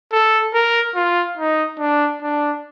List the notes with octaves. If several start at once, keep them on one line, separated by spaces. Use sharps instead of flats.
A4
A#4
F4
D#4
D4
D4